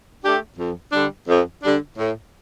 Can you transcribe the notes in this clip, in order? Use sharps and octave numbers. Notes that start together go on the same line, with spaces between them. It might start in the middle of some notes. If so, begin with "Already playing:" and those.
A3 D4 G4
F2
D3 G3 D4
F2
D3 G3 D4
A2